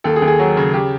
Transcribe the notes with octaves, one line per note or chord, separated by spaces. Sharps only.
D#2 A4
G#4
D#2
G#4
F#3
C#3
G4